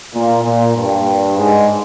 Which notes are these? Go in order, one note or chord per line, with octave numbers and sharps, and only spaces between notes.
A#2
A#2
G2
G#2